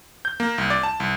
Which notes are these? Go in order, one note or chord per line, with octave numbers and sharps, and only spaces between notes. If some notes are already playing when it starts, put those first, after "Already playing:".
G6
A#3
C2
D5
A5
C2